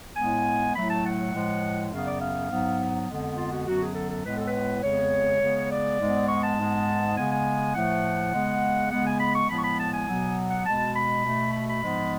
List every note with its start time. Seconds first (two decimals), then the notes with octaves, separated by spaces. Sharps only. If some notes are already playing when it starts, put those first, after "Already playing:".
0.17 A2 G#3 B3 G#5
0.75 A2 F#3 A3 B5
0.89 A5
1.05 F#5
1.33 A2 F3 G#3
1.91 F#2 C#3 F#3 B3 F5
2.06 D5
2.21 F5
2.50 G#2 F#3 B3
3.09 F2 D3 G#3 B3
3.37 F4
3.52 F#4
3.67 F#2 D3 F#3 B3 F#4
3.81 G#4
3.95 A4
4.11 A4
4.25 A2 G#3 B3 B4
4.37 A4
4.48 B4
4.83 F2 C#3 G#3 B3 C#5
5.42 C#3 G#3 B3
5.71 D5
5.99 G#2 G#3 B3
6.29 C#6
6.44 A5
6.57 G#2 G#3 B3
7.16 C#3 G#3 B3 G#5
7.31 G#5
7.75 A2 F3 A3 F#5
8.33 C#3 G#3 B3
8.91 C#3 G#3 B3 F#5
9.06 G#5
9.20 B5
9.35 C#6
9.49 A2 F3 G#3 B3 B5
9.59 C#6
9.64 B5
9.79 A5
9.93 G#5
10.08 B2 F#3 B3
10.51 F#5
10.66 B2 G#3 B3 A5
10.95 B5
11.24 B2 A3
11.53 B5
11.68 B5
11.83 G#2 F3 G#3 B3